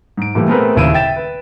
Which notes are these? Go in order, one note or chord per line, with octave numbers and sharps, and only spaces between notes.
G#2 D7
A#2 E3 G3 A3
A3 B3 C4 G#4 A#4 B4
D#1 D#2 C#3 E4 D7 D#7
E5 G5 A6 E7
B4